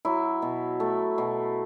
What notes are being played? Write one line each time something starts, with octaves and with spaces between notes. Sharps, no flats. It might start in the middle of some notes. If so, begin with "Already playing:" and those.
F#3 E4
B2
A3
B2